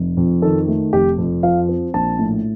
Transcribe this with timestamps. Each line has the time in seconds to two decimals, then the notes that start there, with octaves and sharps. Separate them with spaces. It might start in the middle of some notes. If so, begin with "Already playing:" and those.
Already playing: F1
0.17 F2
0.42 D#3 A4
0.68 A3
0.93 F1 G4
1.18 F2
1.43 F3 F5
1.69 C4
1.94 A#1 A5
2.19 A2